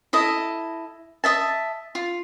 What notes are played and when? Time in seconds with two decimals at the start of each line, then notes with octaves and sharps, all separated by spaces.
0.13 E4 A4 D#5
1.24 D#5 E5 A5
1.95 F4